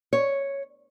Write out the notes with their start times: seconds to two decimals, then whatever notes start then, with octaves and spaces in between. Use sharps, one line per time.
0.13 C#5